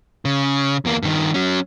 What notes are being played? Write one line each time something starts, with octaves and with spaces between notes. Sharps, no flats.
C#3
E2 A#3
G2 D#3
F#3 C#4